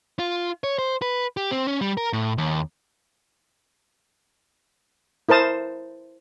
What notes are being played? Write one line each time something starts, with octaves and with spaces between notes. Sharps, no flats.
F4
C#5
C5
B4
G4
C4
C#4
G3
A#4
A2
D#2
E4 A#4 C5 A5 D#6